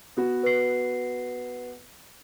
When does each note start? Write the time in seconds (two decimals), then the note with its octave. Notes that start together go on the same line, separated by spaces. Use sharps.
0.17 B3 F#4
0.43 B4 C7